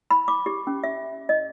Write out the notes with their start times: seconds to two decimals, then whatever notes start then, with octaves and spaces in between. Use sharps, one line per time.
0.11 B5
0.28 D6
0.46 G4
0.67 C#4
0.84 E5
1.29 D#5